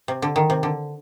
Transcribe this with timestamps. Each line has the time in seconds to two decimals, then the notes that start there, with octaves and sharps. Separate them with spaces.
0.08 C3
0.22 D3
0.36 D#3
0.50 C3
0.63 D3